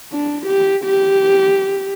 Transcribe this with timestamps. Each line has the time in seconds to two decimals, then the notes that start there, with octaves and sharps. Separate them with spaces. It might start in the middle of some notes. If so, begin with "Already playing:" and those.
0.12 D4
0.47 G4
0.84 G4